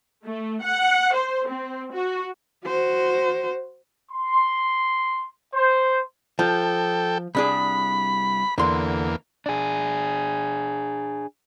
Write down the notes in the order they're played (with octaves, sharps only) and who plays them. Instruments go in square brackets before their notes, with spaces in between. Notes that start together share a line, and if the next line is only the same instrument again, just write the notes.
[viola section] A3
F#5
C5
C4
F#4
[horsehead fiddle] F#4 C5
[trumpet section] C6
C5
[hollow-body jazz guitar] F3 [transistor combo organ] A4 G5
[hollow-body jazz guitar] C2 D4 G#4 [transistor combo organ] B5
[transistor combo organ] E2 A#3 [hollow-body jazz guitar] D3 C6
[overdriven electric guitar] D4 G#4